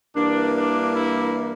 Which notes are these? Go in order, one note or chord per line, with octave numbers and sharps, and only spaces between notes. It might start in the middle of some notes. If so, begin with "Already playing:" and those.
G2 E3 A#3 D4
D4
E4